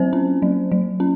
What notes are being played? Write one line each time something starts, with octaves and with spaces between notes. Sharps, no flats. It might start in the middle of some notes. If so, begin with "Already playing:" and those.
Already playing: F#3 C4 C5
C#4
F#3
F#3
C#4